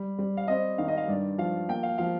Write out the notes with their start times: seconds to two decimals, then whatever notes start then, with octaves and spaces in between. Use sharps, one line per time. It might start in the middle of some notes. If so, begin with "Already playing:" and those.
Already playing: G3
0.18 G3
0.37 F5
0.48 C4 D#5
0.78 D#3 F5
0.88 D#5
0.97 F5
1.08 G2 D5
1.38 F3 F5
1.68 A#3 G5
1.83 F5
1.98 F3 F5